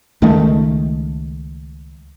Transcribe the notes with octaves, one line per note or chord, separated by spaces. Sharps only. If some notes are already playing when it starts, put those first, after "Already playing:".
C#2 D#3 G#3 A3